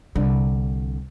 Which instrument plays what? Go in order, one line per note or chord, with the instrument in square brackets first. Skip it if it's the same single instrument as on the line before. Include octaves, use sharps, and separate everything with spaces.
[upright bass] C2 D3